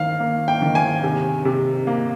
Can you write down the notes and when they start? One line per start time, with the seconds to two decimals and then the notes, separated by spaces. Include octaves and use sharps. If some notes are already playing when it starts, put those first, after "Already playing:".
Already playing: D#3 F5
0.20 A#3
0.48 G5
0.62 D#3
0.75 G#5
1.03 C3
1.45 C3
1.87 A#3